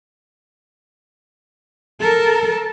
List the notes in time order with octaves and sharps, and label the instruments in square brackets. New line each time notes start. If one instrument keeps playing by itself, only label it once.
[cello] A4 A#4